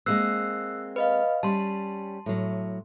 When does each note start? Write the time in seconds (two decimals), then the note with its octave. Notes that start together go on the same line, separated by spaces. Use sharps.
0.06 G#3 A#3 C4 E6 F#6 C7
0.96 B4 D#5 F5
1.43 G3 C#4 A5 C6
2.26 A2 F#3